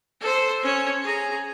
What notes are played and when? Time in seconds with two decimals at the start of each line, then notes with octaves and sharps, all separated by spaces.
0.20 A4 C5
0.62 C#4 C#5
1.03 G#4 A#5